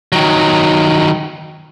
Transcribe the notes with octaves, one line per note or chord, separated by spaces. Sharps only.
D#3 F#3